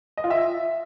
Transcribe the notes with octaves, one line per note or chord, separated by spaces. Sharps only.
D#5
F4
E5